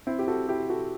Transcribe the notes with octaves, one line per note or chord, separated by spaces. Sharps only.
C4 E4
G4
F#4 A4
E4 G4
F#4 A4